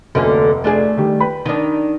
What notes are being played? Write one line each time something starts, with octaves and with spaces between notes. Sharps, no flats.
F1 D2 D3 A#3 C#4
A3 D4 G#4
D#3 G3 G4
B4 G5 B5
D#3 D4